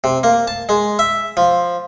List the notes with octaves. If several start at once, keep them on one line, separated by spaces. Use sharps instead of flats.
C3
A#3
A5
G#3
E5
F3